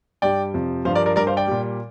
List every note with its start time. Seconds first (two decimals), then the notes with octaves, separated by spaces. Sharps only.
0.22 G2 G3 D5 G5
0.54 F2 C3 F3
0.85 G2 F3 C5 F5
0.95 A#4 D5
1.06 A#4 D5
1.16 G2 G3 A#4 D5
1.27 C5 F5
1.37 D5 G5
1.48 A#2 G3